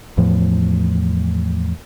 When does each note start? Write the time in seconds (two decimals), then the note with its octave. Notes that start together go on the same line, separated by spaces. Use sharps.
0.17 E2 A2 F3